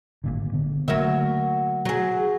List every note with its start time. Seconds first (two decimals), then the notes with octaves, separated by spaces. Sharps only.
0.24 G#1 A#2 D3
0.53 D3 B3
0.88 D3 F#3 A3 A#3 A#4 E5
1.85 F#3 G#4